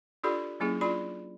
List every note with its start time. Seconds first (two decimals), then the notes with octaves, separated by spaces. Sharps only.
0.24 D4 F4 G4 A4 D5 B5
0.60 F#3 A#3 C#4 E4 G#4
0.81 D4 F4 D5 B5